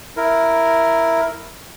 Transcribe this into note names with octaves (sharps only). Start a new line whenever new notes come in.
E4 A#4